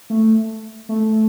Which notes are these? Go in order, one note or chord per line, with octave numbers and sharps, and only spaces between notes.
A3
A3